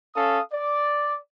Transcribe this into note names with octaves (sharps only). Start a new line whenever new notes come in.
C#4 A4 F5 D#6
D5